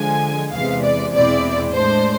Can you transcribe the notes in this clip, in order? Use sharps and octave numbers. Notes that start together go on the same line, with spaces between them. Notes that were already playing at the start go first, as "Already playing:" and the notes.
Already playing: D3 F3 G#3 G#5
E2 C3 E3 G#3 F5
D5
E2 B2 G#3 C4 E4 D5
A2 G#3 D4 C5